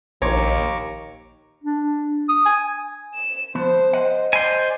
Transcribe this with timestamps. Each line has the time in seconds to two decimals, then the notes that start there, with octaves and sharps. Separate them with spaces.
0.22 A#1 D#2 C5 C#5 A#5 C#6 D6
1.64 D4
2.29 D#6
2.46 G#5
3.14 E7
3.55 F3 B3 C5
3.93 D#5 F#5
4.33 C5 D5 G#5